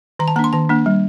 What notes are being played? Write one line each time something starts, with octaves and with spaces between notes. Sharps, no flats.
D#3 A#5
A5
A#3 D4 A#5 C6
D#3 A5
A#3 D4
G3